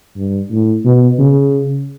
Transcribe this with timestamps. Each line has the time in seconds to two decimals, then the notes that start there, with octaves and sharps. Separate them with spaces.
0.17 G2
0.51 A2
0.85 B2
1.19 C#3